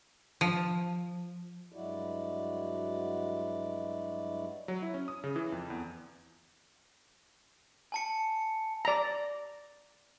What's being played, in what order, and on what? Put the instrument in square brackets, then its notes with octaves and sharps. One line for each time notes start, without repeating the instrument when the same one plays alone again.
[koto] F3
[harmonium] G2 F#3 G#3 E4 F#4 D5
[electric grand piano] F#3
E4
C#4
D#6
C#3
E3
F2
E2
[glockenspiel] G#5 A5 C#7
[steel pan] D5 A#5